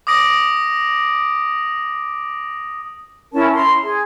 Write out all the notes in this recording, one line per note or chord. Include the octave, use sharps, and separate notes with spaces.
D6 D#6 A#6 D7
C#4 E4 A#4 A5
A#5 C6
G#4